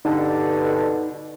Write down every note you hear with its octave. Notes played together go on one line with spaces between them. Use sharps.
G2 B2 D3 D#4